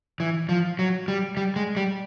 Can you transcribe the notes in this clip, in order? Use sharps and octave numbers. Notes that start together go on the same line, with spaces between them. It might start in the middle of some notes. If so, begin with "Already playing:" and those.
E3
F3
F#3
G3
G3
G#3
G3